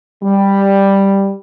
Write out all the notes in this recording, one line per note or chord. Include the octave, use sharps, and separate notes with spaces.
G3